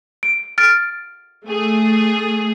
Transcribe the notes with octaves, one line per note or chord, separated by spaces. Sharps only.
D7
F6 A6 D7
A3 G#4